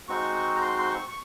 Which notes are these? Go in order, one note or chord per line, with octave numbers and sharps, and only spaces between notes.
G#3 C4 D#4 F#4 C#6
A#5
C6
C6
C#6
C#6